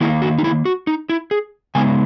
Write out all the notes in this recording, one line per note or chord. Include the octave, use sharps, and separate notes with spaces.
D#3 A#3 D#4 E4
F#4
D#4
E4
F#4
D#4
E4
G#4
C#3 G#3 B3 D#4 G#5